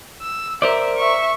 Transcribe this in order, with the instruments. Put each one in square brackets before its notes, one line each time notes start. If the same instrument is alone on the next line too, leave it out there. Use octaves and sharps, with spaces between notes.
[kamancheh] E6
[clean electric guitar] A#4 C5 D5 [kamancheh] E5
[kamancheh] E5 C#6